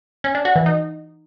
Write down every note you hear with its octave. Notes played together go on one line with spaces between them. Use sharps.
C#4
D4
F#4
E3
D#4